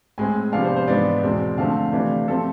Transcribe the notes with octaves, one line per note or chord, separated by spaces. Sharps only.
A2 G#3 C4 G#5
C3 F3 B3 D4 F5
C5
C5
G#2 E3 B3 D4 D5
E2 B2 G#3 C4
D3 F3 A3 C4 F5
C3 E3 A3 D4
C3 F3 A3 C4 A4